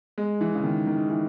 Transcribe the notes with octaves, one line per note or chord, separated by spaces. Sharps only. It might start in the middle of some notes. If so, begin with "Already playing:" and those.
G#3
E3
C#3
D#3
D#3
E3